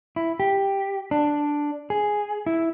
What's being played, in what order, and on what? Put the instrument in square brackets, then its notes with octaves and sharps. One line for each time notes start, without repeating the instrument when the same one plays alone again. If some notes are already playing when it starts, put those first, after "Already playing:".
[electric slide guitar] E4
G4
D4
G#4
E4